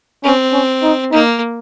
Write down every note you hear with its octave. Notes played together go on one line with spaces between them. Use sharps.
C4 C#4
C#4
D#4
A#3 D#4